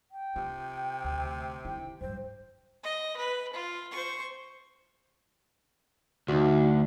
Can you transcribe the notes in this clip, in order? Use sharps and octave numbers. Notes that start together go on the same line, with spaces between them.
G5
C3 F4
D2
D#3 E4 G5
D1 G2 C5
D#5
B4
F4
C5 C#6
D2 D#4 F#4